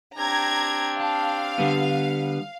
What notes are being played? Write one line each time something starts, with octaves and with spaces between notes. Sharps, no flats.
C4 D4 G4 A#5 G#6
F5 A5
D3 G3 B3